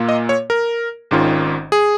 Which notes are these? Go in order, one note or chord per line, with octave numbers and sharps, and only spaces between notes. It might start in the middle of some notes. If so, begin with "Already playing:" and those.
Already playing: A#2 A#3 F4
D#5
C#5
A#4
G#1 G#2 D#3 C#4 F4
G#4